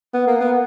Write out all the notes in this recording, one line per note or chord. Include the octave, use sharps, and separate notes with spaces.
B3
A#3
B3